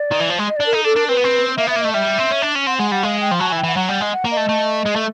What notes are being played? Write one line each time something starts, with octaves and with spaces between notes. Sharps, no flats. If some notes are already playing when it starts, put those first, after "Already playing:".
Already playing: D5
D#3
E3
F3
G#3
D#5
D5
D4
A#4
D#4 A4
D4 A4
D4 A#4
C4 B4
B3
C4
A#3 E5
B3 E5
A#3
A3 D#5
G3 E5
C4
C#4
D4
C#4
C4 F#5
G#3 F#5
G3 F#5
G#3 F5
G5
F3
F#3 A5
G#5
E3
G5
E3 F#5
F#3 F#5
G3
G#3
F#5
A#3
D#5
A3
A3
G#3
A3